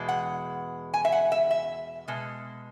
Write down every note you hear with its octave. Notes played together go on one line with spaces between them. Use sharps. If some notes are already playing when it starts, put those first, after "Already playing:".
Already playing: E2 B2 G#3
F#5
G#5
E5
F#5
E5
E5
B2 G#3